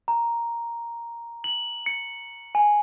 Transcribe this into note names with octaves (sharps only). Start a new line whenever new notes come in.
A#5
F#7
C#7
G#5